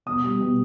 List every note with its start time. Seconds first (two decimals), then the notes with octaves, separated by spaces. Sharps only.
0.06 B2 D#6
0.23 G3
0.40 B2